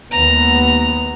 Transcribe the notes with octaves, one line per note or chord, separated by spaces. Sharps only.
D#2 G#3 B3 A#5